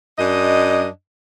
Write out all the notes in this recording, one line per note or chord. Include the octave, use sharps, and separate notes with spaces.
F#2 D4 D#5